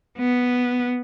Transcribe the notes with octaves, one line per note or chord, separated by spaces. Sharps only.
B3